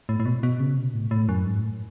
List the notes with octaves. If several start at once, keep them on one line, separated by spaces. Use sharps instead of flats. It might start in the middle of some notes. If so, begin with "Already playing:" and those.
A2
A2
B2
B2
C#3
B2
A2
A2
F#2
G#2
A2